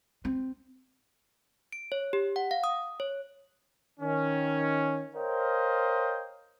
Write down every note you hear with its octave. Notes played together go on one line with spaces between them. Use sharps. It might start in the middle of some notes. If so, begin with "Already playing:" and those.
C4
D7
C#5
G4
F#5
F5
D#6
C#5
D#3 C#4
A#4 C5 C#5 D#5 F5 G5